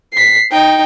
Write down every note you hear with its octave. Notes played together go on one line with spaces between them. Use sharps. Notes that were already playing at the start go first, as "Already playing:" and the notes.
B6 C7
D#4 G5